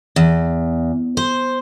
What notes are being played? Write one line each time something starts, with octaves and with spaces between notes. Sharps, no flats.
E2
C5